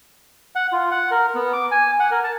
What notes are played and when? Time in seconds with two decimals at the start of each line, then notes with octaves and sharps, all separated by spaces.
0.56 F#5
0.72 F4
0.91 F#5
1.11 A#4
1.35 B3
1.53 D6
1.71 G#5
2.00 F#5
2.11 A#4
2.24 A5